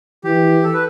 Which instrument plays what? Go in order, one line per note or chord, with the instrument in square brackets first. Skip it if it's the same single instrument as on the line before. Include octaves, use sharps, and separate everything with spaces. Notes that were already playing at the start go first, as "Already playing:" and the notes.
[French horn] E3 [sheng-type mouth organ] G4
[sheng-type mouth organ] A4
B4